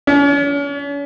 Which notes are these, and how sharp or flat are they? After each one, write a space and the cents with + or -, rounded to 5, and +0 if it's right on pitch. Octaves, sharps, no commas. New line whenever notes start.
C#4 +40